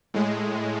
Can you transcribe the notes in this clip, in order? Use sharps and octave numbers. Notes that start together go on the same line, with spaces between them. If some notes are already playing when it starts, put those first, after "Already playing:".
A2 G#3